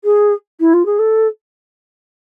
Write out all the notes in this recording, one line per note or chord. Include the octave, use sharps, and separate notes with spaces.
G#4
E4
F4
G#4
A4